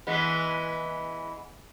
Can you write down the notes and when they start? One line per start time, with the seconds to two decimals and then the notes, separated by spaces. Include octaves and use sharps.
0.07 E3 G#3 B3